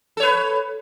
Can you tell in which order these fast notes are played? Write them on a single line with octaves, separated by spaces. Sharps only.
A4 C#5 B4